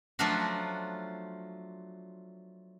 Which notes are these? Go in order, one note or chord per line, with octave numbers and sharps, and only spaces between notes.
F3 F#3 A3 D4 F4 F#4